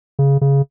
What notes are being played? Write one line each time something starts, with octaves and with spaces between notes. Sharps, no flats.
C#3
C#3